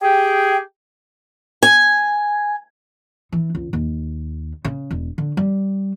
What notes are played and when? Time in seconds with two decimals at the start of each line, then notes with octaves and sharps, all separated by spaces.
0.02 G4 G#4 G5
1.63 G#5
3.32 E3
3.55 C#2
3.73 D#2
4.65 C#3
4.91 E1
5.18 D3
5.37 G3